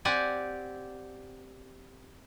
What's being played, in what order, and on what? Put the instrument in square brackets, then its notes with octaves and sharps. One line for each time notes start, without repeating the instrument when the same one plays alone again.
[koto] C4 G4 D5 F#5 G#5